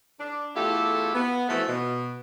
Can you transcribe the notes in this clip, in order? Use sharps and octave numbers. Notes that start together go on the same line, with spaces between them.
D4
E2 A3 E4 F4 G4 A4
B3
E3 F3 A3 B3 F#4 A4
B2